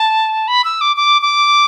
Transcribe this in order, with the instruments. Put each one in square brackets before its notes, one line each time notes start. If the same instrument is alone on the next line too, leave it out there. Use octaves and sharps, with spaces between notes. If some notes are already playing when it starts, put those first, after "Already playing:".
Already playing: [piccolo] A5
B5
E6
D6
D6
D6